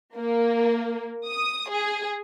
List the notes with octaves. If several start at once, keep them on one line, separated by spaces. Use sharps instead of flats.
A#3
D#6
G#4